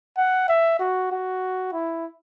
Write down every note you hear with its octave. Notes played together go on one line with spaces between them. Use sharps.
F#5
E5
F#4
F#4
E4